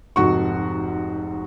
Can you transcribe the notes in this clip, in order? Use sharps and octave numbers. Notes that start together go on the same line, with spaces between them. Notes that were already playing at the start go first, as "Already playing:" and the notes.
F1 G#2 F#4 C#6